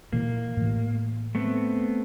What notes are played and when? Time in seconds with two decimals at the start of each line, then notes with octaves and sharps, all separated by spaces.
0.13 A#2 E3 A#3
0.57 A2 E3
1.35 A3 B3 C4